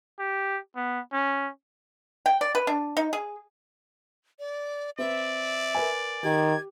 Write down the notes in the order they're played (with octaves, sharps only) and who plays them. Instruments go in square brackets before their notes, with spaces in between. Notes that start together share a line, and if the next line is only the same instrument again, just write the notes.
[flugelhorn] G4
B3
C#4
[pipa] G5
D5
B4
D4
D#4
G#4
[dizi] D5
[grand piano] C4 B4 [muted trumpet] D5 [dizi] E5
[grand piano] A#4 B4 G#5
[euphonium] D#3 [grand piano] G4 [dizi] G#6